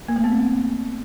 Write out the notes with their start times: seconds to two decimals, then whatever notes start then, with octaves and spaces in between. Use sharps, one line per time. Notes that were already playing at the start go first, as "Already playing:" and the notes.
0.08 A#3
0.16 A3
0.24 B3
0.32 C4